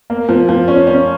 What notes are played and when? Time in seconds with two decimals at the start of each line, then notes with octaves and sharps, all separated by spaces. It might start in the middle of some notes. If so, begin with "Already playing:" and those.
0.10 A#3
0.29 F3
0.48 F3
0.68 C#4
0.87 C#4